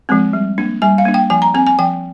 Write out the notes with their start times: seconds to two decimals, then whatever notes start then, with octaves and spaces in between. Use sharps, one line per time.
0.09 F3 G#3 C4
0.33 G3
0.58 A#3 D4
0.82 G3 G#5
0.98 F5
1.05 A#3 D4
1.14 G5
1.30 F3 G#5
1.42 A#5
1.54 C4 G#5
1.67 G#5
1.78 F3 G5